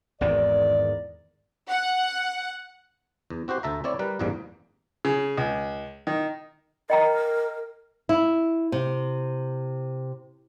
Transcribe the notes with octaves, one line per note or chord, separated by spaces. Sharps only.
G#1 E2 D#3 D5
F#5
E2
C4 F#4 G4 C5
D2 A4 E5 A#5
C4 E4 C#5 D5
G3 A#4 B4
A1 E2 G#2 G3 A#3
C#3
C#2
D#3
A#4 D#5 G5 A#5
E4
C3